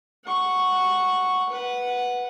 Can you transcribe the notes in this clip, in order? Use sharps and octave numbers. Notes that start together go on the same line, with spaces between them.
F#5 C#6
B4 F#5